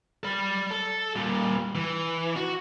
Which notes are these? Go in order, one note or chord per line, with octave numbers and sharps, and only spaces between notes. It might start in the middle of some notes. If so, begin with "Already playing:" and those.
D5 B5
A4
A#2 G3
E3
F#4